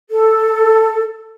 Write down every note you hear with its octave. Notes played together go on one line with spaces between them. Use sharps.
A4